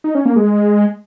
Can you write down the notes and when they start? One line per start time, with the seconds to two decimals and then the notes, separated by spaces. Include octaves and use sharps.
0.04 D#4
0.15 C#4
0.25 A#3
0.36 G#3